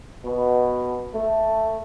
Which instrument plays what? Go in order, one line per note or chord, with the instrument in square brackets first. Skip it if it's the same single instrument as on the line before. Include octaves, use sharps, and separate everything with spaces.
[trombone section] B2
A3